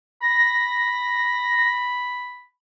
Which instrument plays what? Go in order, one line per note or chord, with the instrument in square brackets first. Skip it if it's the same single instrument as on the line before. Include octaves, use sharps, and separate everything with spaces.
[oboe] B5 [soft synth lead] A#6